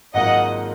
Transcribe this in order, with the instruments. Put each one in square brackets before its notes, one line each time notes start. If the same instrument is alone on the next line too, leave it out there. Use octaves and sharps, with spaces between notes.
[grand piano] G#1 G#2 F#3 A#3 F4 [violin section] D#5 F#5